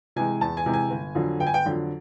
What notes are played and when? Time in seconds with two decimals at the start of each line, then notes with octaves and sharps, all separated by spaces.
0.16 C3 E3 G#3 G#5
0.41 E2 A5
0.57 G#5
0.66 C3 E3 G#3
0.73 G#5
0.90 G1
1.15 F2 D3 F#3
1.40 G1 G5
1.47 G#5
1.54 G5
1.65 F2 D3 F#3